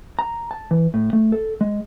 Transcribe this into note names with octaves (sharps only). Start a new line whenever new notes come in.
A#5
A5
E3
A2
A3
A4
G#3